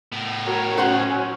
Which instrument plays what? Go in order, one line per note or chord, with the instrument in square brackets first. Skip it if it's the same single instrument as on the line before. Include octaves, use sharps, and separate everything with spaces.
[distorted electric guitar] A2 B3
[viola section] F#4 A#4 C#5
[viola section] F#3 C#4 [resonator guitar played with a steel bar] F#4 C5 F#5